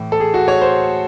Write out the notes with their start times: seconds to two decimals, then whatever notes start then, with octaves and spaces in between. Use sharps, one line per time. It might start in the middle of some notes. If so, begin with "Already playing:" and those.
Already playing: A2 E3
0.12 A4
0.20 G#4
0.34 F#4
0.48 C#5
0.61 C5